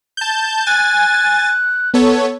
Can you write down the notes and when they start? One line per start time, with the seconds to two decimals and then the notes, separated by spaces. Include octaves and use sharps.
0.17 A5 G6
0.66 G#5 F#6 A6
1.94 B3 A4 C#5